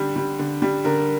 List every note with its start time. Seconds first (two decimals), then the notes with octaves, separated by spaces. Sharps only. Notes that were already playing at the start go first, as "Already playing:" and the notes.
Already playing: D3 G3
0.16 G3
0.39 D3
0.62 G3
0.84 D3 A#4